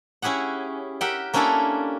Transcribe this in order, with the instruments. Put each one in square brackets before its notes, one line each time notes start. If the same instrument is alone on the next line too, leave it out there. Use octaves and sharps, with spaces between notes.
[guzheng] C#4 E4 G4 G#4 F#5
G4 A#4 E5 F#5 G5
A#3 C#4 D4 E4 G4 A4